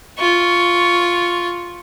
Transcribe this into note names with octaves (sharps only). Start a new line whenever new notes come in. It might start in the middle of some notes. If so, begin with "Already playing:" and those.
F4 C#6